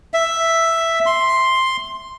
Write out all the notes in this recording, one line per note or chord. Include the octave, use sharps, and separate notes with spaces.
E5
C6